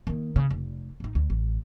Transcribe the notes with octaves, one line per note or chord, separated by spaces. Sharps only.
D#3 A#3
C#3
F1
A1 D#4
D2
A1